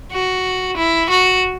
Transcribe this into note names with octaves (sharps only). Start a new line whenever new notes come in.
F#4
E4
F#4